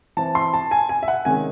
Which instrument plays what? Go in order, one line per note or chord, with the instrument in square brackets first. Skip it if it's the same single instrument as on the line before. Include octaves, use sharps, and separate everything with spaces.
[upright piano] E3 C4 A5
C6
A5
G#5
G#5
E5
F#5
C3 D#3 G#3 C#4 G#5